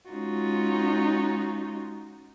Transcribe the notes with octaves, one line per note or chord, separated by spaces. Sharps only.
G#3 C#4 D#4 F4 F#4